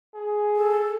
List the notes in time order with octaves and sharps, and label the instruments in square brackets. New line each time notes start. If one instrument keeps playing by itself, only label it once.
[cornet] G#4
[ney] A4